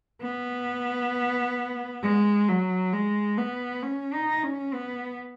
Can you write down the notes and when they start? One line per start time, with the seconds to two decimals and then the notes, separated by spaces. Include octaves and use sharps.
0.22 B3
2.03 G#3
2.48 F#3
2.93 G#3
3.38 B3
3.83 C#4
4.13 D#4
4.43 C#4
4.73 B3